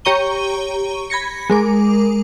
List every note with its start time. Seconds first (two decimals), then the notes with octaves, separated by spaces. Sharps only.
0.05 G4 C#5 A#5 C#6 D#7 G7
1.10 B5 G#6 A#6 C#7
1.50 G#3 A#4 D6